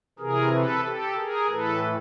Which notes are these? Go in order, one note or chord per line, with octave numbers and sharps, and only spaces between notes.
C3 E3 G#4 A#4
A4 B4
G4 A4
G#4 A#4
A2 E3 A4 B4